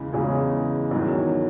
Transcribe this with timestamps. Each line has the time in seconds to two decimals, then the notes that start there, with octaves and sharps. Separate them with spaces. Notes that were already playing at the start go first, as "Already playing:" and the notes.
Already playing: E2 C#3 E3 G#3
0.13 E2 C#3 E3 G#3
0.91 E2 D#3 F#3